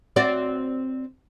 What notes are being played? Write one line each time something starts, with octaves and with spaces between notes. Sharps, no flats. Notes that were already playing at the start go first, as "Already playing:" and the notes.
C4 F#4 D5